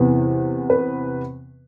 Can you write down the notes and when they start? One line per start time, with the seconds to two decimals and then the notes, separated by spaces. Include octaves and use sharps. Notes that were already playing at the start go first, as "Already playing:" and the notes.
Already playing: E2 C3 E3 B3
0.70 B4